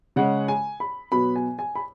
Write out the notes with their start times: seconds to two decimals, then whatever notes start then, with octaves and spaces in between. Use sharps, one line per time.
0.16 C#3 G#3 C#4 F#5
0.48 G#5
0.80 B5
1.12 B2 F#3 B3 B5
1.36 G#5
1.59 G#5
1.75 B5